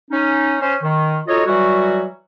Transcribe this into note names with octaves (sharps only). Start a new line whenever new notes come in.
C#4 D#4
C#4 C5
D#3
D#4 F4 F#4 A4 C#5 D#5
E3 F#3 G3 F#4